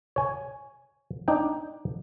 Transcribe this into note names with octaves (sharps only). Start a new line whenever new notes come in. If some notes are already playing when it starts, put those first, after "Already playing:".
C#5 G#5
D4 D#4 G5